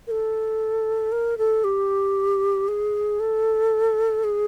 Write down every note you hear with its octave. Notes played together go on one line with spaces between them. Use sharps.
A#4
A4
A#4
A4
G4
G#4
A4
G#4